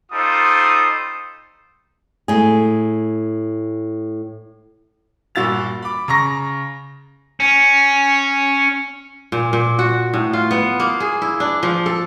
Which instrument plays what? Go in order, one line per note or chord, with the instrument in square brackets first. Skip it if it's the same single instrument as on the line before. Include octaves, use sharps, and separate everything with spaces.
[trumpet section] G3 D#4 F4 A4 C5 D#6
[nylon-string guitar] A2 G#4
[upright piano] G2 A#2 F#4 E6 A6 F7
B5 D6
C#3 A#5 C#6 A#6
[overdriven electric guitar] C#4
[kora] A#2
A#2
F#4
A2
F4
B3
A#3
G#4
E4
D4
F3
A4